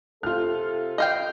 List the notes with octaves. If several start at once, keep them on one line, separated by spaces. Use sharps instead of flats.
C3 F4 A4 F6
D#5 F5 G5